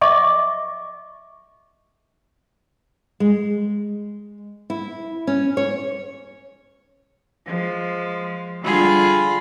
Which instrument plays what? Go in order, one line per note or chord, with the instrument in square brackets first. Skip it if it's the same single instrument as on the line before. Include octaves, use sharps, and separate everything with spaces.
[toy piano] D#5 E5 C#6 D6
[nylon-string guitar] G#3
E4
C#4
C#5
[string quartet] F3 G#3
D3 G3 F4 G#4 B5